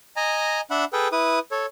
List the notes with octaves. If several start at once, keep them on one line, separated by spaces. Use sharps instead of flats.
D#5 G#5 A#5
D4 E5 F#5 B5
G#4 A4 B4 G5
E4 B4 D#6
A4 C#5